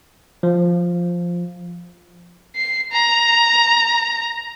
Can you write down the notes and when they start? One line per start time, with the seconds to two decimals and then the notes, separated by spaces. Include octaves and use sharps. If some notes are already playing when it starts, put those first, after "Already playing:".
0.43 F3
2.56 C7
2.92 A#5